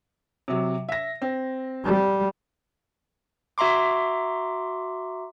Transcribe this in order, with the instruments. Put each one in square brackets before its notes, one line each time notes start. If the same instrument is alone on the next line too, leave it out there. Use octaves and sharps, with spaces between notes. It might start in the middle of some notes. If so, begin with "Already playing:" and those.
[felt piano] C3 F#3
E5 A#6
C4
[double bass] G3
[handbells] F#4 E5 A#5 C6 D6